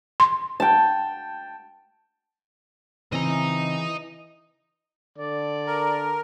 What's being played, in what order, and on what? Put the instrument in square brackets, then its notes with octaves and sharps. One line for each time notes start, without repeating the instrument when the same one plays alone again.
[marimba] C6
[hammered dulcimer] G5 A5
[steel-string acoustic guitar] C#3 C4 [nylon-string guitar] E3 [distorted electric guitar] D#5 A#5
[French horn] D3 [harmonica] D5
[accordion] A#4